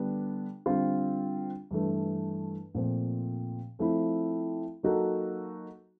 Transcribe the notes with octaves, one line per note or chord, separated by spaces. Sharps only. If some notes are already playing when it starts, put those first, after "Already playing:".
Already playing: D3 G3 B3 D4
D3 G3 C4 F4
G2 E3 A3
A#2 F3 A3 C4
F3 A3 C4 E4
F#3 A#3 D#4 F#4 A4